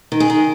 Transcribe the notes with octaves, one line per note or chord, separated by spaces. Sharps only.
D#3
G#4
D#3